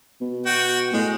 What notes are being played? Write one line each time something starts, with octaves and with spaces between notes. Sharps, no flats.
B2
F#4 G5
A2 G#3